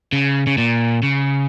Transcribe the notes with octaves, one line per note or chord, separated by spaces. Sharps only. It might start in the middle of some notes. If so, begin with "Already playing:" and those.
C#3
C#3
A#2
C#3